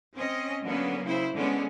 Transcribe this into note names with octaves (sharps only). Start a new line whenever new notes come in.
C4 C#4 D#5
D3 F#3 A#3 B3 C#4
C#3 E4 C5
D3 G#3 B3 C#4